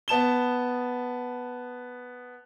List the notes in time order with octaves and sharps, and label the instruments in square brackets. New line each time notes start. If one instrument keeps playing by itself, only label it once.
[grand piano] B3 A5 E7 G7